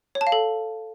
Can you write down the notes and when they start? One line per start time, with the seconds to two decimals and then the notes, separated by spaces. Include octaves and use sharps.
0.15 C#5
0.21 A5
0.27 F5
0.32 A4